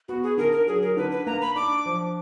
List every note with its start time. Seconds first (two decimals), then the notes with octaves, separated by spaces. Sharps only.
0.08 B3 F#4
0.23 G#4
0.37 D3 A#4
0.52 A#4
0.67 F#3 G#4
0.82 A#4
0.97 D3 B4
1.11 B4
1.26 A#3 A#5
1.41 B5
1.55 D4 D6
1.86 F3